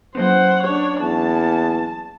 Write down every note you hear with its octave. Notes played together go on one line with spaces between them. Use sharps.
F#3 A#3 C#4 C5 F#5
D4 C#5
E2 A5